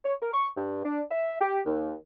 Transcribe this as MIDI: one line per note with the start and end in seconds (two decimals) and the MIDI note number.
0.05 0.15 73
0.21 0.31 70
0.33 0.49 85
0.57 0.84 43
0.85 1.02 62
1.11 1.36 76
1.41 1.61 67
1.66 1.94 39